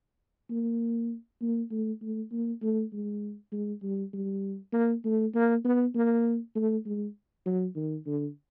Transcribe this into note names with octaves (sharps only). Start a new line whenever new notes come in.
A#3
A#3
A3
A3
A#3
A3
G#3
G#3
G3
G3
A#3
A3
A#3
B3
A#3
A3
G#3
F#3
D#3
D3